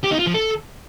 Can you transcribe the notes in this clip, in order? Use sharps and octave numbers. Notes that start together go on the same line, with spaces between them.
G4
D#4
F4
F3
A4